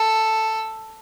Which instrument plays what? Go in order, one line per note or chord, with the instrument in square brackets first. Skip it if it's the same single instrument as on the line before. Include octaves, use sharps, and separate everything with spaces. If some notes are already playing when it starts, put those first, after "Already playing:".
Already playing: [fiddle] A4